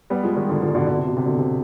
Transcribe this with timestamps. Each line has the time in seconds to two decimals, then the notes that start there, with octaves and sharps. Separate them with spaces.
0.10 G3 B3
0.23 F3 G#3
0.36 D#3 G3
0.49 D3 F3
0.61 D3 F3
0.68 D#3
0.75 B2 D3
0.87 B2 D3
0.98 C3
1.07 B2
1.17 C3
1.26 B2 D3
1.39 C3